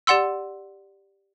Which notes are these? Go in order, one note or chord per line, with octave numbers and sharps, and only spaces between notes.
G4 D5 F#5 C6 E6